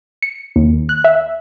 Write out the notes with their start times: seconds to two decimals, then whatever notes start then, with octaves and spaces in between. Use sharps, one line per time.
0.22 C#7
0.56 D#2
0.89 F#6
1.04 E5